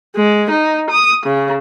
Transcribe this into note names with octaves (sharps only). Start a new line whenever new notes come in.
G#3
D#4
D#6
C#3